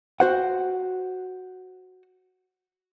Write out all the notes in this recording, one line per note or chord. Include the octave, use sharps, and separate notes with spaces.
F#4 C5 F#5